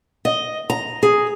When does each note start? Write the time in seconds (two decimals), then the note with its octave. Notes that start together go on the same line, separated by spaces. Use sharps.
0.25 D#5
0.70 A#5
1.03 G#4